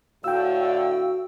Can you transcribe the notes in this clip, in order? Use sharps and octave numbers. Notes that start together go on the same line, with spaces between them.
A2 D3 F#4 F5 G5 E6